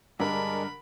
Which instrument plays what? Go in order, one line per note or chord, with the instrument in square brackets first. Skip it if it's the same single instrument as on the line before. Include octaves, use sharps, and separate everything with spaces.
[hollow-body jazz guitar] G2 [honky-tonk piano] D3 A#4 [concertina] G#3 D4 [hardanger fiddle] B5